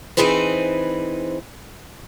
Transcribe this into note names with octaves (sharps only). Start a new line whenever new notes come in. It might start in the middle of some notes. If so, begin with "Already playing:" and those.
E3 C4 D#4 G#4 B4 C5